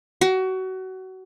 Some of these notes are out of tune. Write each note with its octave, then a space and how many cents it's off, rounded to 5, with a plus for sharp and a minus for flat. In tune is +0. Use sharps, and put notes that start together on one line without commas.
F#4 +25